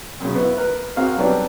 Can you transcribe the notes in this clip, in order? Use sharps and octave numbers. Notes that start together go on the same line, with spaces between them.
F#2 C#3
B3 E4
A#4 B4
A#3 C4 F#4 G#4 F5
F#3 G3 B3 C4 D4 A4